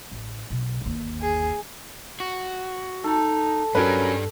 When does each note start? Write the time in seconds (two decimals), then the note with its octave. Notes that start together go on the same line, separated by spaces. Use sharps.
0.12 A1
0.50 B1
0.81 G1 D#2
1.22 G#4
2.20 F#4
3.04 D#4 A4
3.75 G2 F#3 G3 C#4 A#4 B4